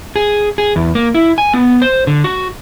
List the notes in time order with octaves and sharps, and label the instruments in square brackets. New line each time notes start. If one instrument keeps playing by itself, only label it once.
[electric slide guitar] G#4
G#4
E2
A#3
E4
G#5
B3
C5
D3
F#4